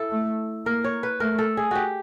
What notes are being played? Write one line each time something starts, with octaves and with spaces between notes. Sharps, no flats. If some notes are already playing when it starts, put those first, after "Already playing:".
Already playing: E4 A4
A3
A#3 A#4
C#5
B4
A3 A#4
A4
G#4
F#4 G4